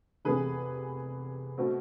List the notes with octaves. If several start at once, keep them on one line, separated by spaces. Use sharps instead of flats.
F1 E2 C3 G#4 B4
B2 A3 C4